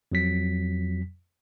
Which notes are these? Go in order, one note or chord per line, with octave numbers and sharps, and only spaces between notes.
F2 F#3 B6